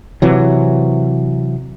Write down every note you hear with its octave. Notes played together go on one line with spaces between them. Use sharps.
C3 E3 F#3